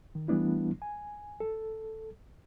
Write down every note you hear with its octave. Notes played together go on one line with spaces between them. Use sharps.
D#3
E3 G3 A3 B3 D4 E4
G#5
A4